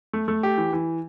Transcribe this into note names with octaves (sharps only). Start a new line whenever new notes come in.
A3
A3
G4
E3
E3